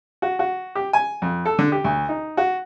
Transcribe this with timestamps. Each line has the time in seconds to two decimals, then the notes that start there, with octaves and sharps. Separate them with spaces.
0.22 F#4
0.39 F#4
0.75 G4
0.93 G#5
1.22 F2
1.46 A4
1.59 D3
1.72 G4
1.84 D2
2.09 D#4
2.37 F#4